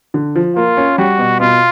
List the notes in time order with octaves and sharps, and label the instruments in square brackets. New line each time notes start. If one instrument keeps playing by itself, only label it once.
[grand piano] D3
F3
[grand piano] A#3 [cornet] F4
[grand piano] C#4
[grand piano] G3 [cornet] F#4
[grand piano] B2
[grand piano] B2 [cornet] F4